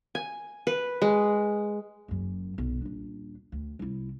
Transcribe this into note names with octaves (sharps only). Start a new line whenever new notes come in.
G#5
B4
G#3
F#1 F#2
B1
D#1 D4
D2
C2 E4